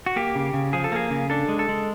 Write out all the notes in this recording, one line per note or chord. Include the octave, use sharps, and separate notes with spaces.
F#4
A#3 G4
C#3
C#3
F3 G#4
A4
A#3 G#4
C#3
D4 A4
G#3
A4
G#3